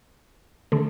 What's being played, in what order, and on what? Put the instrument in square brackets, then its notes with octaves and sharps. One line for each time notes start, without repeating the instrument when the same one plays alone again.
[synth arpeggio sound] D3 A3